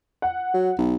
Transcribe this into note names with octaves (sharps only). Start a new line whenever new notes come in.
F#5
F#3
B1